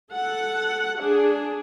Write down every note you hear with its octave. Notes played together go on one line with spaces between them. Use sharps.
A4 F#5
D4 G#4